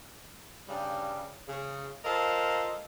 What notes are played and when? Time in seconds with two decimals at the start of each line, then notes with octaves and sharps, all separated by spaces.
0.68 G2 C#3 G3
1.48 C#3
2.05 F4 A4 A#4 C5 D#5